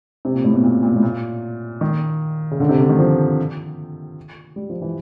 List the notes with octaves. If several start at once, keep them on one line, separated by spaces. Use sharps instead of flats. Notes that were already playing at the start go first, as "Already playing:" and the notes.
C3
A#2
A2
B2
A#2
A#2
A2
A#2
D#3
C#3
D3
C3
D3
D#3
F3
G3
F3
E3